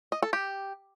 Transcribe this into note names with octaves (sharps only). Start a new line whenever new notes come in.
D#5
A4
G4